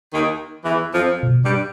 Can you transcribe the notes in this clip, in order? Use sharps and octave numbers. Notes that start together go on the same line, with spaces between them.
D#2 D#3
E2 E3
F2 F3
B2
G2 G3